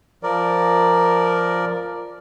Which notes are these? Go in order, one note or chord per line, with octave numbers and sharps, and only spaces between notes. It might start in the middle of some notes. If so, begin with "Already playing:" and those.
F3 A#4 D5